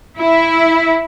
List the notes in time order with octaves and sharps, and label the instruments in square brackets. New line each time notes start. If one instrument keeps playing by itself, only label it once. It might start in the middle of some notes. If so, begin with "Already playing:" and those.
[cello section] E4